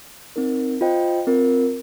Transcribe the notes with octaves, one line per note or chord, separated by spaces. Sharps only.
C4 D#4 A#4
F4 C5 D#5 G5
C4 F4 A#4